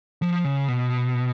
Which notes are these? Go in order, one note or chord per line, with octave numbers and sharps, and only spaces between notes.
F3
C#3
B2